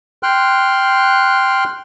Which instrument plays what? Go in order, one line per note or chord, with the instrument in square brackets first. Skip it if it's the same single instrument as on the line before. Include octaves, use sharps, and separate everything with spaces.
[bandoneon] G5 C6 F6 F#6